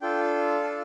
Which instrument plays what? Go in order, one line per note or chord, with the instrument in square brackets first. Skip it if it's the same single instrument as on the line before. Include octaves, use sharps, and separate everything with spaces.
[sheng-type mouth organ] D4 F4 A4 G5
A5